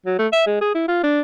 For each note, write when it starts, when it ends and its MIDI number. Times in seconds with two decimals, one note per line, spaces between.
0.06 0.18 54
0.19 0.27 57
0.33 0.44 76
0.47 0.61 56
0.61 0.73 68
0.75 0.84 64
0.88 1.02 65
1.03 1.21 62